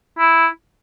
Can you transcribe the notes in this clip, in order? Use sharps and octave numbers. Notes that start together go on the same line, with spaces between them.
E4